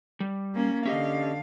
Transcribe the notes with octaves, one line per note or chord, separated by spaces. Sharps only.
G3
A#3 C#4
D3 C#4 G4 D#5 F5